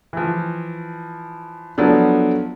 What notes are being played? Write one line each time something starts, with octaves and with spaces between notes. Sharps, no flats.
E3 F3
F3 F#3 A3 B3 D4